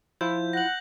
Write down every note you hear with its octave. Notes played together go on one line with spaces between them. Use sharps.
F3 E4 F4 G6
F#5 A#6 F#7